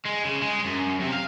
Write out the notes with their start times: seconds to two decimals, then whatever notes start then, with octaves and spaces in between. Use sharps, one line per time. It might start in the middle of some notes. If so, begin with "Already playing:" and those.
0.05 G#3
0.25 C#3
0.42 G#3
0.66 F#2
1.01 C3
1.13 F5